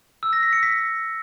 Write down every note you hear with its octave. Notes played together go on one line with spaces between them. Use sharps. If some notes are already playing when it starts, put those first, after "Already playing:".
E6
A#6
B6
C#7
B6